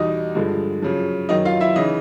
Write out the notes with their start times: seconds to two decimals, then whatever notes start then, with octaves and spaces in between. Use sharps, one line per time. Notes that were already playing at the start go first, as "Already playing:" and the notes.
Already playing: E2 B2 G3 D#4 D#5
0.35 G2 D3 F3 G#3
0.82 F#2 C#3 F3
1.29 F#2 D#3 F#3 D#4 D#5
1.45 F4 F5
1.61 E4 E5
1.76 C#3 E3 D#4 D#5